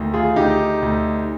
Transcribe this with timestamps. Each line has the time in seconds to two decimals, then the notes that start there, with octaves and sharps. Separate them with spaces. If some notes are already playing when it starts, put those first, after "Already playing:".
Already playing: D2 D#3
0.14 F4 G#4
0.36 D2 D#4 G4
0.82 D2